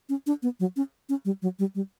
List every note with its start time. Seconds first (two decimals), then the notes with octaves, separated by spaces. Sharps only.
0.09 C#4
0.26 D4
0.42 B3
0.60 F#3
0.76 C#4
1.09 C#4
1.25 G3
1.42 F#3
1.59 G3
1.75 G3